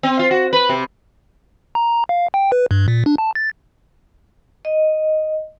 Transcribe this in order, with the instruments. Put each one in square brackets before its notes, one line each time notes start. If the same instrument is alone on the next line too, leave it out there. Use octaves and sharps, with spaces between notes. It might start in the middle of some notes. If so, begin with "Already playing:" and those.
[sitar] C4
F4
F#4
B4
C3
[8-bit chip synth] A#5
F5
G5
B4
G2
A#2
D4
A5
A6
[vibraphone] D#5